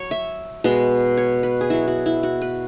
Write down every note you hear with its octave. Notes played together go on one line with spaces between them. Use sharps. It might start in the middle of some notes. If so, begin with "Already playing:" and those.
Already playing: F#3 C#5
E5
B2 G#3 B3
C#5
B4
G#4
F#3 E4 F#4
F#4
E4
F#4
B4